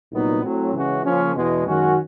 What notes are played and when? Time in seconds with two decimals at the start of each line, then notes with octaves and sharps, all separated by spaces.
0.11 C2 A#2 F#3 B3 D#4
0.43 A2 F#3 A3 C4
0.74 C#3 E3 G#3 C#4 F#4
1.04 C#3 F3 A#3 C#4
1.35 E2 B2 G#3
1.66 F#2 D#3 G#3 C#4 F#4